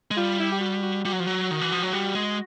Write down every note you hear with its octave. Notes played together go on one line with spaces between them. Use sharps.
G#3
G3 F4
E4
G4
F#4
F#4
G3 F#4
F#3
F3
F#3
D#3
E3
F3
F#3
G3
G#3